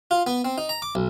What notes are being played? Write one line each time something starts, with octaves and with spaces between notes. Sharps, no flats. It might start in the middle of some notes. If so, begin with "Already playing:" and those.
F4
B3
C4
D#4
A#5
D6
B1